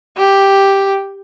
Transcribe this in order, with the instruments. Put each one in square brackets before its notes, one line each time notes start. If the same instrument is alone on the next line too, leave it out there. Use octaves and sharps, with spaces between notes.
[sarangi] G4